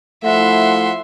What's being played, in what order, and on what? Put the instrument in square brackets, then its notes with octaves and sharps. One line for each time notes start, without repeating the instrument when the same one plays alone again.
[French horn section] F3 E4 [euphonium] A3 [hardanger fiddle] E5 C6 [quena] F#5